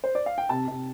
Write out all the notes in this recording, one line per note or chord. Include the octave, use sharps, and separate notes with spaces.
C5
D5
F5
G5
C3 A5
C3